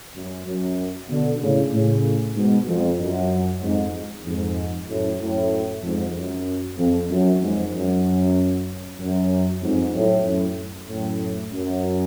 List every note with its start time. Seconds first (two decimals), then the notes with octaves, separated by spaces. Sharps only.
0.15 F#2
0.47 F#2
1.09 B2 D3
1.41 A2 C#3
1.73 A2 C#3
2.35 G#2 B2
2.68 F2
3.00 F#2
3.62 F2 G#2
4.25 F2 G#2
4.88 F#2 A2
5.20 F#2 A2
5.83 F2 G#2
6.15 F#2
6.78 F2
7.10 F#2
7.42 F2 G#2
7.73 F#2
9.00 F#2
9.62 F2 G#2
9.94 F#2 A2
10.26 F#2 A2
10.88 F#2 A2
11.52 F#2